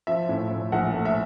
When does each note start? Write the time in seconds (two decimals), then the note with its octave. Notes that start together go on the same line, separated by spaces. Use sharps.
0.07 F3 E5
0.29 A2
0.51 A2
0.72 A#1 F#5
0.94 A3
1.05 E5